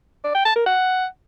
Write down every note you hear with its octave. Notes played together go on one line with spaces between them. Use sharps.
D5
G5
A5
A#4
F#5